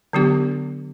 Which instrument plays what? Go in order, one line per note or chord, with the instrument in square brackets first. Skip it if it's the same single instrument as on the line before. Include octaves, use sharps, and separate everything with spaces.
[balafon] D3 F#3 B3 D4 G4